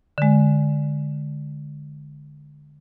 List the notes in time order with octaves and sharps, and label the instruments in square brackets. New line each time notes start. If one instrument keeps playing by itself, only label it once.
[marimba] D3 G#3